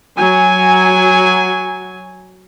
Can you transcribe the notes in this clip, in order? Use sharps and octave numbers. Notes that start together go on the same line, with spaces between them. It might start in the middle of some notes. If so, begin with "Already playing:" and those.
F#3 G#5